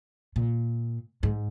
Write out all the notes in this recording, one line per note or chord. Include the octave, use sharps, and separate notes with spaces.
A#2
G#2